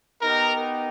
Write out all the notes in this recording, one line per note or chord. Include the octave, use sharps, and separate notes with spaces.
B3 D#4 G4 A#4